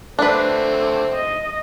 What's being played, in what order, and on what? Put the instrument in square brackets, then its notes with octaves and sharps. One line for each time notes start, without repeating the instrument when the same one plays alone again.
[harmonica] D3 A3 C4 [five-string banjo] D4 B4
[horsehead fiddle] D#5